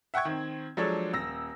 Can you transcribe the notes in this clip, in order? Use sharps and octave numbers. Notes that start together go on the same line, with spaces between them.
E5 F#5 G5 C#6 G#6
D#3 C4
F3 F#3 G#3 D4 A4 C#5
D#1 E6 A#6